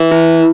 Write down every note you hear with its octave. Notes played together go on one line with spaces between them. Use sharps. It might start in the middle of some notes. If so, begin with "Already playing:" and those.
Already playing: E3
E4